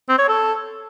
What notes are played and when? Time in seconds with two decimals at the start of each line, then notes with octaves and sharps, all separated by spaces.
0.09 C4
0.19 C#5
0.28 A4